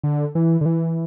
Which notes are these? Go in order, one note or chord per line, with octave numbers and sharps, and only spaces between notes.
D3
E3
D3
E3